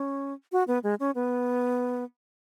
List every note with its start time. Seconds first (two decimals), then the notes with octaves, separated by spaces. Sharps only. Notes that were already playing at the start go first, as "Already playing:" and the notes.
Already playing: C#4
0.52 F#4
0.68 B3
0.83 G#3
1.00 C#4
1.15 B3